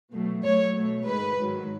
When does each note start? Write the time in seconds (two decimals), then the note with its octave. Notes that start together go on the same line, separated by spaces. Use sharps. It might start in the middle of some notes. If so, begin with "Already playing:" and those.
0.12 B2 F#3 A3
0.43 A2 F#3 A3 C#5
0.75 B2 A3
1.06 G#2 D#3 G#3 B4
1.38 G#2 D#3 F#3